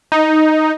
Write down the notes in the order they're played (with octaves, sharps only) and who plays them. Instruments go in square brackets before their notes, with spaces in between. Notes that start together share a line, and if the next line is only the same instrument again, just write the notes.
[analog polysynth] D#4